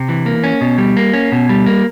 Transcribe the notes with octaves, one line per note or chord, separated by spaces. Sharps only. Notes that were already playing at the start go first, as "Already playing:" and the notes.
Already playing: C3
E3
A#3
C#4
B2
G3
A#3
C#4
B2
G3
A#3